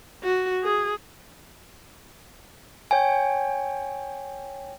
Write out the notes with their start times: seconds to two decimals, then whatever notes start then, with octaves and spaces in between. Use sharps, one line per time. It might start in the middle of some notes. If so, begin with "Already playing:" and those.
0.24 F#4
0.63 G#4
2.91 C#5 G5 G#5